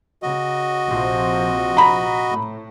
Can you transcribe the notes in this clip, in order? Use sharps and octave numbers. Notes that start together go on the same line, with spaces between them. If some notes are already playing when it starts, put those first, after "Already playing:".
C#3 F#4 D#5
A#1 C3 F3
A#5 B5
A2